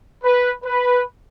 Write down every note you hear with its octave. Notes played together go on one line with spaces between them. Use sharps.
B4
B4